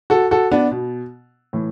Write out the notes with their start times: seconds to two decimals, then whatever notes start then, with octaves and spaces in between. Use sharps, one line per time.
0.10 F#4 A4
0.31 F#4 A4
0.51 B3 D4
0.71 B2
1.53 A2 E3